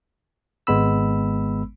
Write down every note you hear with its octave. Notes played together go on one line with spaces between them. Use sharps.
G#1 G#3 B3 B5 E6